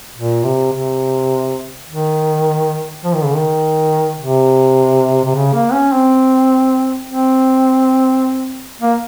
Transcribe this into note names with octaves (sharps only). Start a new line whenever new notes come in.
A#2
C3
C3
D#3
F3
D#3
C#3
D#3
C3
C3
C#3
A#3
C#4
C4
C4
A#3